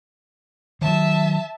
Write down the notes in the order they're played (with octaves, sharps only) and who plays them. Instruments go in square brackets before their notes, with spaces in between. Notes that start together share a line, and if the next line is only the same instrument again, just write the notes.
[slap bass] D#3 F#3 [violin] E5 A5